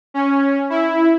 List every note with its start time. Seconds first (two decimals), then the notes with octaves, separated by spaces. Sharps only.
0.14 C#4
0.70 E4